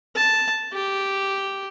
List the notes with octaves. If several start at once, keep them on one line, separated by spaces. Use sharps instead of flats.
A5
G4